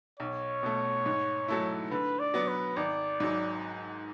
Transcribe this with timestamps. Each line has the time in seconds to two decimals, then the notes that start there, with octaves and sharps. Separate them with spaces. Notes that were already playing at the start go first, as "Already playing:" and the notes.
0.20 B1 C#5
0.63 B2 A3
1.06 G#2
1.48 F#3 A3 E4
1.91 D3 B4
2.19 D5
2.34 F#3 B3
2.48 B4
2.76 G#1 D5
3.20 G#2 F#3